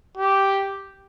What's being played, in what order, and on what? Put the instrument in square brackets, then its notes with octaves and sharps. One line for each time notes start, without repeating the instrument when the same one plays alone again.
[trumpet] G4